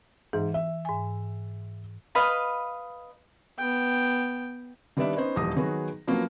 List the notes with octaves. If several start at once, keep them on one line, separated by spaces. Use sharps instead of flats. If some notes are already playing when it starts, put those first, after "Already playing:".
G#2 E3
E5
G#2 G#5
B4 D#5 F5 B5
B3 G5
D#3 G3 B3 D4 D5 E5
B3 C#4 D#4 C5
D#1 A#1 E2 D#6 A#6
D#3 F#3 B3 F#4 G#4
F3 F#3 A#3 B3 C#4